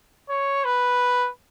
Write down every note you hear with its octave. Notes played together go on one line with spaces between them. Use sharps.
C#5
B4